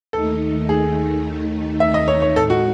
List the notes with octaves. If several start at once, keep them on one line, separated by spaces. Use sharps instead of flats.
D#2 D#3 A3 D#4 A4
G#4
E5
D#5
C#5
C#5
A2 G#3 D#4 A4
F#4